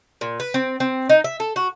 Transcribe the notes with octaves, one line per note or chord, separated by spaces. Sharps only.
A#2
B4
C4
C4
D#4
E5
A4
F#4